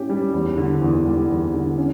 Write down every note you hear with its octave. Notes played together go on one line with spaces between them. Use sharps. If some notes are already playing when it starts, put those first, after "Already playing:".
Already playing: A2 C#4 G4
G3
E2
D3
E2
G3
E2
D3
C#4